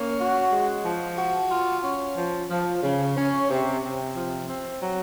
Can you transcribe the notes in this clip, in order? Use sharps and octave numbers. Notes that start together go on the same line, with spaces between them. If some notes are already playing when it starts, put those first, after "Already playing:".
Already playing: A#3 C#4
F#4
G#3
F3
F#4
F4
C#4
F3
F3
C#3
C#4
C3
C3
F3
C4
F#3